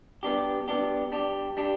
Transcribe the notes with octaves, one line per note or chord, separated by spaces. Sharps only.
G3 B3 D4 G4
G3 B3 D4 G4
G3 D4 G4
G3 D4 G4